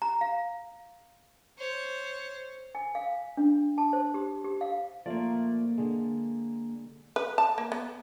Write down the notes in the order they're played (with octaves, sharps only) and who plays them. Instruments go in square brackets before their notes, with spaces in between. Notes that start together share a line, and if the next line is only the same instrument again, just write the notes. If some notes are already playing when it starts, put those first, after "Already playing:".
[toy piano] A#5
F5
[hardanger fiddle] C5 C#5
[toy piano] G#5
F5
D4
A5
C5
G4
G4
F5
[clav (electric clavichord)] F3 A3 F4 [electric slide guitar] A#3 D5
[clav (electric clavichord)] D3 G#3
[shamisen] B4
A5
A#3
B3